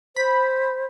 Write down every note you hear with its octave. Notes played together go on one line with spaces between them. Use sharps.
C5 B5